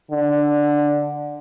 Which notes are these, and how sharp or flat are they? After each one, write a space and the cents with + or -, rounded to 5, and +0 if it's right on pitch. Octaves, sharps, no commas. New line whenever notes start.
D3 +5